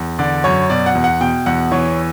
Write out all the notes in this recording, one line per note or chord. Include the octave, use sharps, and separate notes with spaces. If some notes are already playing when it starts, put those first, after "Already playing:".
Already playing: E2
D3 D5
F#2 C#5
B2 D5
F#5
E2
F#5
B2 G5
E2 F#5
E3 C#5